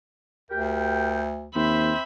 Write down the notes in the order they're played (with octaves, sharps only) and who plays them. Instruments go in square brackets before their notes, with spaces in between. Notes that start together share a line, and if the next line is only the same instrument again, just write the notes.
[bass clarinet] D2 [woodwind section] G4 A#4 G5
[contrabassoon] D#2 [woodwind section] C4 C5 [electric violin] E5 B5